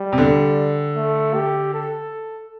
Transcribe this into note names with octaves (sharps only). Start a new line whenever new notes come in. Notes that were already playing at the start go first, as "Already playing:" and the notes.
Already playing: G3
C3
D3
A3
G4
A4